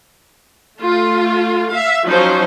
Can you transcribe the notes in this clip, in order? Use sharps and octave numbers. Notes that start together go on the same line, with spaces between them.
A3 F4
E5 F5
F3 F#3 C#4 D#4 C5